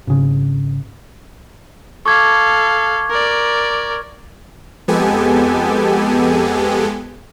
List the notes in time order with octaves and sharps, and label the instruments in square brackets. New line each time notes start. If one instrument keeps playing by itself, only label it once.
[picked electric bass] G#1 C#3
[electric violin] A4 F5 [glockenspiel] C#6 D6 G#6
[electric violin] A#4 D5
[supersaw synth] F2 G#3 B3 G4 A4 G#5